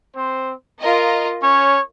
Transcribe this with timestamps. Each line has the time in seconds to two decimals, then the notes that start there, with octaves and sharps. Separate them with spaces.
0.16 C4 C5
0.79 F4 A#4 D#5
1.43 C#4 C#5